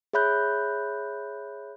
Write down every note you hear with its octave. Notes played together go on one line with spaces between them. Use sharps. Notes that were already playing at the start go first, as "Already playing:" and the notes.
G#4 C#5 E5 B5 F#6 G6